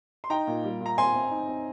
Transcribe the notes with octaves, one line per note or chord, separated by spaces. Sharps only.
C6
D#4 G5 A#5
A#2
G3
A#2
A#5
C4 G#5 C6
C4
D#4
C4